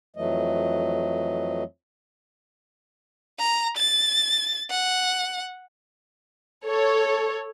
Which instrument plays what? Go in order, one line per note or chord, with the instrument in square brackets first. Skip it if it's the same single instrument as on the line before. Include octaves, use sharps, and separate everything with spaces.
[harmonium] F2 E3 F#3 A3 D#5
[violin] A#5
A6
F#5
[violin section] A4 C#5